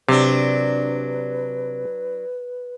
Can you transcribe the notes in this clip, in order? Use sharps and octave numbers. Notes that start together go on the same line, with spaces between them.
C3 F#3 D4 B4